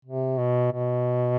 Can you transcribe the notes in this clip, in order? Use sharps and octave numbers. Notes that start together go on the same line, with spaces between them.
C3
B2
B2